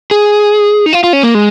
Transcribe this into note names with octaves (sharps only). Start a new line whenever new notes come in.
G#4
D#4
F4
F4
C#4
A#3
G#3